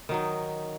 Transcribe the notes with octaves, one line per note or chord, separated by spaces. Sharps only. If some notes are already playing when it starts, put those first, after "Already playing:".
D#3 F#3 D#4